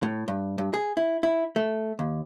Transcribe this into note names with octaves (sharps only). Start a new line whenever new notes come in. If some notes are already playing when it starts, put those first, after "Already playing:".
A2
G2
G2
G#4
E4
E4
A3
D#2